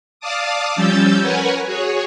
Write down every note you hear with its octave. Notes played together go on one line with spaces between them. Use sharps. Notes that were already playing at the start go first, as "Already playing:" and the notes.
D5 F5 A5 D6 D#6
F3 G3 C#4 E6 G6 A6
A#4 B4 C#5 F#5 G#5
F#4 G#4 C#5